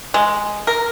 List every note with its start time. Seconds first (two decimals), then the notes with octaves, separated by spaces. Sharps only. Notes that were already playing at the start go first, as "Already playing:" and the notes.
0.14 G#3
0.67 A#4